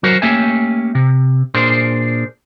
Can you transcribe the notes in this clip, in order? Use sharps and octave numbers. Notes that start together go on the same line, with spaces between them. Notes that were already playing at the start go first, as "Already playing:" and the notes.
F#3 F#4 A#4 C5
A3 A#3 C#4 G4 E5 G#5
C3
A#2 D4 G#4 A#4 C5 C6